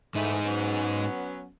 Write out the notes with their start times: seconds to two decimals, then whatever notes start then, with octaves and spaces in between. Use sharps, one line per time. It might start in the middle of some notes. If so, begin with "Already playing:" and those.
0.15 G#2 E3 A3 D#4
0.45 F#3 B3 C#4